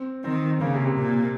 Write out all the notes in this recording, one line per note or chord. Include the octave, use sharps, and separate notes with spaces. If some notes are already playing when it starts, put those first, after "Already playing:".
Already playing: C4
D#3 C4
C#3 A#3
C3
C3
A#2